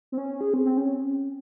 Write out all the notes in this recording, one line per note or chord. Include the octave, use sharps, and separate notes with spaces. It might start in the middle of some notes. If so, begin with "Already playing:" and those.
C4
C#4
G#4
C4
C4
C#4